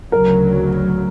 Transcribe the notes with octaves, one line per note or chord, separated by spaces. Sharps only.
D2 C#3 F#3 A#4